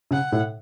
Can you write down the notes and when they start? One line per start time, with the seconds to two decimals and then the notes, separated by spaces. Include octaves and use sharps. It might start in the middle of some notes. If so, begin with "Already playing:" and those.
0.11 C#3 F#5
0.32 A2